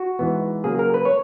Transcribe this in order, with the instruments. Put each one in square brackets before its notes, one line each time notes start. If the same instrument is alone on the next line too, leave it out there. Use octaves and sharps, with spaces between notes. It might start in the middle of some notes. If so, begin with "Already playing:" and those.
Already playing: [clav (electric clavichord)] F#4
G#2 E3 B3
C#3 F#3 A#3 G#4
A#4
B4
C#5